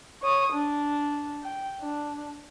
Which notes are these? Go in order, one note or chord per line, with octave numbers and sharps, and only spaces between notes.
C#5 D#6
D4
G5
D4